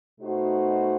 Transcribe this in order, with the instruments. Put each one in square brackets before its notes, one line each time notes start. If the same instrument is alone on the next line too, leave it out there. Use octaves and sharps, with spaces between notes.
[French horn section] B2 A3 D#4 F#4 C5